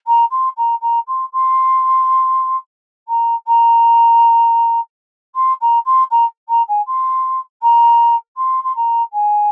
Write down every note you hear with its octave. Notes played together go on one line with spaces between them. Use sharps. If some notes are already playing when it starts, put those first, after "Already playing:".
A#5
C6
A#5
A#5
C6
C6
A#5
A#5
C6
A#5
C6
A#5
A#5
G#5
C6
A#5
C6
C6
A#5
G#5